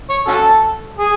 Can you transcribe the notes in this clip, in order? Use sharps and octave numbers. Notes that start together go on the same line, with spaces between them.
C#5
C#4 F#4 A4
G#4